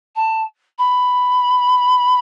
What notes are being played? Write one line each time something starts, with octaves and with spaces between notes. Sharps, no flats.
A5
B5